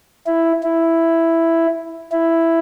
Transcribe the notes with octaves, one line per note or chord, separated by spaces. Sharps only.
E4
E4
E4